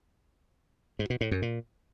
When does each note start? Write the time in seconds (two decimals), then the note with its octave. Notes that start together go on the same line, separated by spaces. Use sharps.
0.99 G#2
1.10 B2
1.21 A2
1.31 F#2
1.42 A#2